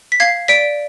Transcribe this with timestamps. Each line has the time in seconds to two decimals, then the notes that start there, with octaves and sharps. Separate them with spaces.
0.12 B6
0.20 F5 G#6 C7
0.48 D5 B6 D7